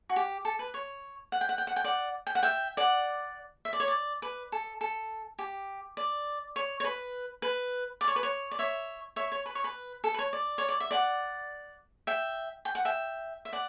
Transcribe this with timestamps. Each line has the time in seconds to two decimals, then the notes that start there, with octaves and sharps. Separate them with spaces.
0.10 F#4
0.16 G4
0.45 A4
0.59 B4
0.74 C#5
1.32 F#5
1.41 G5
1.49 F#5
1.58 G5
1.67 F#5
1.76 G5
1.84 D5 F#5
2.27 G5
2.35 F#5
2.43 E5 G5
2.77 D5 F#5
3.65 E5
3.73 D5
3.80 C#5
3.88 D5
4.22 B4
4.52 A4
4.81 A4
5.39 G4
5.97 D5
6.56 C#5
6.80 C#5
6.84 B4
7.42 B4
8.01 D5
8.08 C#5
8.16 B4
8.23 C#5
8.51 D5
8.59 C#5 E5
9.16 C#5 E5
9.32 C#5
9.46 B4
9.55 C#5
9.64 B4
10.04 A4
10.14 B4
10.19 C#5
10.33 D5
10.58 C#5
10.69 D5
10.80 E5
10.91 D5 F#5
12.07 E5 G5
12.65 G5
12.75 F#5
12.85 E5 G5
13.45 E5
13.53 D5 F#5